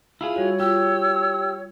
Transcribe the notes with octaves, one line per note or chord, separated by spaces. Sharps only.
E4 F4 G#4
G3 F#4 C#5
F4 G4 E6